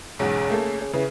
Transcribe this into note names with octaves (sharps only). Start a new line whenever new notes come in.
B1 E2 G#2 C#3
A3 A#3 A4
C#3
C#3 E3